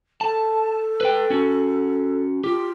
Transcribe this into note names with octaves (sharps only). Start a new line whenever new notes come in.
A4 A5
B4 G5
C#4 F#4
F4 G4